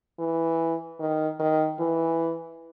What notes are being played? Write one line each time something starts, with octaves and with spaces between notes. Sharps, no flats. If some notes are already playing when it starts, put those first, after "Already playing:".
E3
D#3
D#3
E3